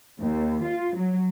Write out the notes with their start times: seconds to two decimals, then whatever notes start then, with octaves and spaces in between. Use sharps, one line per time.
0.21 D#2
0.65 F4
0.96 F#3